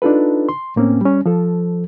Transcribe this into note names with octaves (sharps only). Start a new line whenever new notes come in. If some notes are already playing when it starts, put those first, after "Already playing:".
D4 D#4 F4 A4 B4
C6
A2 A#3 C4 C#4
G3 C#4
F3 A4